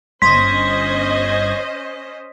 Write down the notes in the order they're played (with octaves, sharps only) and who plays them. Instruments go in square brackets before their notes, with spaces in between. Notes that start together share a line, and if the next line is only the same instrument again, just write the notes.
[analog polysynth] G1 G#6 A#6 [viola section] C#4 C5 D#5 [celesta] C6 [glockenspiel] B6